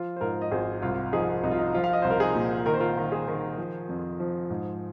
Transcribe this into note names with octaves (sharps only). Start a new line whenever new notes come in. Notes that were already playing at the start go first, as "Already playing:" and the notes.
Already playing: F3 F4
C5
G#2 F4 A#4
D#5
G#1 G#4 C5
C2 F4
F3 D#4 G#4
C2 D#4
F4
D#4
F3 F4
F5
D#5
C2 C5
A#4
D#4 G#4
A#2
D#3 A#4
C5
F4 A#4
D#3
G#4 C5
D#3
F3
F2
F3
G#2